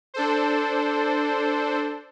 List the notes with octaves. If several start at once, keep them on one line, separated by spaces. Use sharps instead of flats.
D4 A4 C5